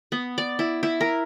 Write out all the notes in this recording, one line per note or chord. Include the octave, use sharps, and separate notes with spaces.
B3
D5
E4
E4
A#4